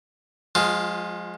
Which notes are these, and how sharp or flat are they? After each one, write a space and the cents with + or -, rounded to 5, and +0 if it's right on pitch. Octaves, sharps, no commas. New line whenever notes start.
F3 +35 G#3 +0 F4 +0